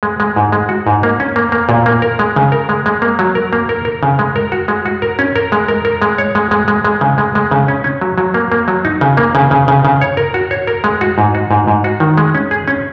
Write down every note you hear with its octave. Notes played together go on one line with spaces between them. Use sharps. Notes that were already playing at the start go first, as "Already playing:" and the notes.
G#3
G#3
G#2
G#3
F#4
G#2
A#3
C#4
A#3
A#3
A#2
A#3
A#4
G#3
C#3
A#4
G#3
G#3
A#3
F#3
A#4
A#3
A#4
A#4
C#3
G#3
A#4
F#4
G#3
F#4
A#4
C#4
A#4
G#3
A#4
A#4
G#3
C#5
G#3
G#3
G#3
G#3
C#3
G#3
G#3
C#3
C#4
C#4
F#3
F#3
A#3
A#3
F#3
D#4
C#3
A#3
C#3
C#3
C#3
C#3
C#5
A#4
F#4
C#5
A#4
G#3
F#4
G#2
F#4
G#2
G#2
F#4
D#3
G#3
C#4
G#4
C#4